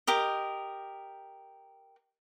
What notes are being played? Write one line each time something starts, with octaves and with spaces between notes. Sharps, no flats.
G4 A#4 D#5